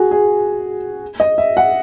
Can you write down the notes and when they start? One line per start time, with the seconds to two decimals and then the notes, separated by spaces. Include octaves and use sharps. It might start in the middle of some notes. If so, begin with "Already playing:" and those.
Already playing: F#4 G#4
0.11 G#4
1.20 D#5
1.38 E5
1.57 F#5